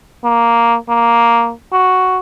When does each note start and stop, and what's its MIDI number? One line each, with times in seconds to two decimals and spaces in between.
0.24 0.76 58
0.89 1.52 58
1.73 2.19 66